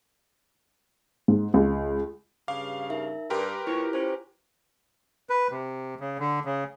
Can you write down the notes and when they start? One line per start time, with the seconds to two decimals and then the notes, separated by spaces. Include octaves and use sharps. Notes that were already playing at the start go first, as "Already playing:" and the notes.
1.28 G#2
1.54 C#2
2.48 G2 C#3 F5 D6
2.90 D#4 A#4 E5
3.30 G2 G4 A#4 B4 C6
3.67 D#2 E4 F4 C5 C#5
3.93 C#4 C5
5.30 B4
5.51 C3
6.00 C#3
6.19 D3
6.45 C#3